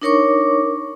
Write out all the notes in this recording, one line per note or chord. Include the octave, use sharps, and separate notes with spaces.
D4 D#4 A#4 C#5 C#6 D6